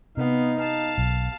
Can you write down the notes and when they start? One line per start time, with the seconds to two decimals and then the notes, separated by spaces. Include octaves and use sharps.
0.17 C3 B3 D#4 F5
0.59 F5 A5
0.98 B1